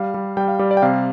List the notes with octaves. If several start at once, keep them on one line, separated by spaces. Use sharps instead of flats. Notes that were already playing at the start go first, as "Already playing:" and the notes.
Already playing: G3 F5
G3
G3 G5
F5
G3 D5
D5
G5
C3 F5